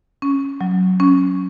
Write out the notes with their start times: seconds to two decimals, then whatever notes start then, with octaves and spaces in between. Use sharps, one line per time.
0.22 C#4
0.61 F#3
1.00 C#4